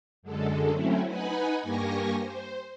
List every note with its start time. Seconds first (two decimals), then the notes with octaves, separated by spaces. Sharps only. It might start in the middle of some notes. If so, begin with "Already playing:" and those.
0.23 F#2 D3 G#3 A4
0.71 F#3 A3 C4 C#4 E4
1.08 D#4 B4 F#5 G#5 B5
1.63 G2 A#3 G4 G#5 C#6 A#6
2.21 C5